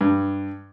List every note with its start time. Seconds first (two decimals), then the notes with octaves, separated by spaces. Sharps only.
0.01 G2